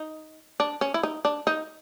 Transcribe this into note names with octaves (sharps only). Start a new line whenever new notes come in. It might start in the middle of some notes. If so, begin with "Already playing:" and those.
Already playing: D#4
D4
C#4
E4
D#4
D4
D#4